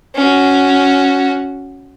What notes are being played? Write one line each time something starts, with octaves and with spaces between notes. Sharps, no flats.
C#4 F#4